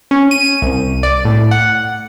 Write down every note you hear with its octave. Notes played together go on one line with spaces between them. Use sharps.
C#4
D#7
C2
D5
A2
F#5